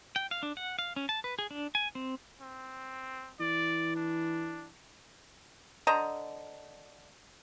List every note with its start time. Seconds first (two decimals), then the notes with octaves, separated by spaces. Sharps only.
0.16 G5
0.31 F5
0.43 D4
0.57 F#5
0.79 F5
0.96 C#4
1.09 A5
1.24 B4
1.39 G#4
1.51 D4
1.75 G#5
1.95 C4
2.41 C4
3.40 E3 D5
3.95 D4
5.87 D3 C5 D#5 A#5